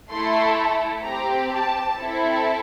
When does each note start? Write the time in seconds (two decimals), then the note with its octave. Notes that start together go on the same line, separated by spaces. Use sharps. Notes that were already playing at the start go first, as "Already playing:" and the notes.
0.11 A3 E4 A4 C6
1.04 C4 G4 A#5
1.52 A5
1.97 C4 E4 A4